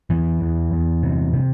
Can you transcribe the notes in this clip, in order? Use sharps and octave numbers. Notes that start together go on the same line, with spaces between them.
E2 E3
E2
E2
C3
C3